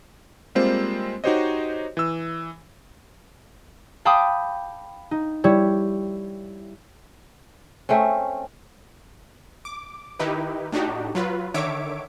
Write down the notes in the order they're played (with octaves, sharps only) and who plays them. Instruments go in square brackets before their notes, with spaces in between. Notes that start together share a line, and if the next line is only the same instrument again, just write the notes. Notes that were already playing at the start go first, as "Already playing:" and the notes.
[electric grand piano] G3 G#3 A#3 C4 F4 C5
D#4 F#4 G4 C5 C#5 D#5
E3 E6
[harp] F5 G5 A5 B5 D6 D#6
D#4
G3 E4 C#5
[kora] A3 C4 C#4
[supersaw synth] D6
D#3 D#4 E4 G4 B4
A2 D4 D#4 F#4 G4
F#3 F4 B4
D3 D#3 C#5 E5 D6 D7